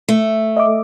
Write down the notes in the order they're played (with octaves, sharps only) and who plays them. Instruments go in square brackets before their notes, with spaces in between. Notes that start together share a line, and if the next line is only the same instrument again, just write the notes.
[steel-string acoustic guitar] A3
[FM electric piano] D#5 E5 D6